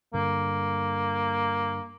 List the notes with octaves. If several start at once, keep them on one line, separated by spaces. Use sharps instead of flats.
G2 D3 A#3